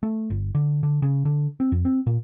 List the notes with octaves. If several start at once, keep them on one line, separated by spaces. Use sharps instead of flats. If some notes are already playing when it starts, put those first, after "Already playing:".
A3
G1
D3
D3
C#3
D3
C4
F2
C4
A#2